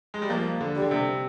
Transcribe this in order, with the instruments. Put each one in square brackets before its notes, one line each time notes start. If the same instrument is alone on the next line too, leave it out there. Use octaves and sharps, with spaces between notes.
[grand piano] G#3
G3
[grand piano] F3 [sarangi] A#3
[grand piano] D3
[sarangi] G3
[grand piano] D3
C3